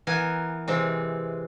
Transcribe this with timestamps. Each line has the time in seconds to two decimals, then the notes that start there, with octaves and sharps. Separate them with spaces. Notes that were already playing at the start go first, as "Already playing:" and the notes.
0.07 E3 B3 A#4 G#5
0.68 C3 E3 G#3 C4